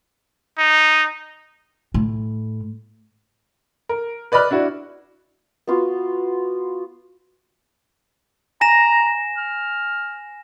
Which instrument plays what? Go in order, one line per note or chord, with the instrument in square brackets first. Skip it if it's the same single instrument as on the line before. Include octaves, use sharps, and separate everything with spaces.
[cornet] D#4
[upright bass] A2
[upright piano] A#4
B4 D5 D#5 B5 F6 F#6
D4 E4 F#4 D5
[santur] B3 F4 F#4
[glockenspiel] G#5 A#6 E7 [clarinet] A#5
[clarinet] F6